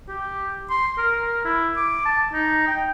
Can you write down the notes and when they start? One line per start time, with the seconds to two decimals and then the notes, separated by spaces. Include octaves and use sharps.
0.08 G4
0.70 C6
0.98 A#4
1.22 A#4
1.45 E4
1.77 D6
2.05 A5
2.33 D#4
2.68 G5